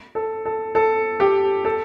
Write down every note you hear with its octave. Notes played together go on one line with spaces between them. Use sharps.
A4
A4
A4
G4
A4